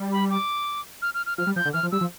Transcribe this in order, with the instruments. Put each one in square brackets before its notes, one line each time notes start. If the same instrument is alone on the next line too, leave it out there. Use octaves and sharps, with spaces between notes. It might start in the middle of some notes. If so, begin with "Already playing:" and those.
Already playing: [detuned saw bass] G3
[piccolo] B5
D6
F6
F6
F6
[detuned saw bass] F3 [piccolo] F6
[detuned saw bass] G3
[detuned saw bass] F3 [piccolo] G6
[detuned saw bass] D3
[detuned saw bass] E3 [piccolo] F6
[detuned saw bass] F3
[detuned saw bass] G3 [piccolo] E6
[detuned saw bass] F3